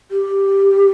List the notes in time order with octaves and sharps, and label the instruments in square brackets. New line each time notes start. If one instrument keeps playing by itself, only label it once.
[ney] G4